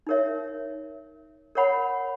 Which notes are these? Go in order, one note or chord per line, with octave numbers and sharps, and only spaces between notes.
D#4 A#4 C#5 E5
A#4 C#5 F#5 B5